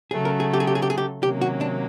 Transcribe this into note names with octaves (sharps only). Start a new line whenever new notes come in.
C#3 F#3 A3 G#4
A#4
G#4
G4
G#4
G4
G#4
G4
G#4
G4
C3 D#3 F#3 A#3 C#4 G4
F#4
D4